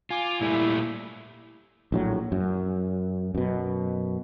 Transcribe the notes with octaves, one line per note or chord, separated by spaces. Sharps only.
F4 G#5 D6
A#2 G3 A3 E4
A#1 A2 F#3
F#2
F#2 B2